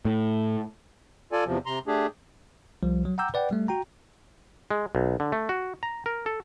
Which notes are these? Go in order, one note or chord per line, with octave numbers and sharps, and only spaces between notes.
A2
F4 A4 D5 G#5
E2 C3 F3
C3 A#5 C6
A3 D4 G4 G#4
C2 F3 G3
F#3
F#5 G5 A#5 D6 E6 G6
B4 D5 F#5 G5
G3 A3
F#4 G5 A#5
G#3
B1
D3
A3
F#4
A#5
A#4
A4